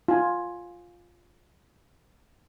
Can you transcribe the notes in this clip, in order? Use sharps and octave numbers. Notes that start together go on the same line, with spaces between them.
F4 G#5